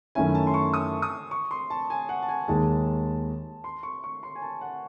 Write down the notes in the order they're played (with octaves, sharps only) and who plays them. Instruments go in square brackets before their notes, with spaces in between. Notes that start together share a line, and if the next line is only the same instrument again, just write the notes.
[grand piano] F#2 D#3 A3 C#4 E4 [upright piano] G#5
[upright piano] A5
C6
C#6
D#6
D#6
C#6
C6
A5
G#5
F#5
A5
G#5
[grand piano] D#2 D#3 G#3 [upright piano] A5
[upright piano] C6
C#6
C#6
C6
G#5
A5
F#5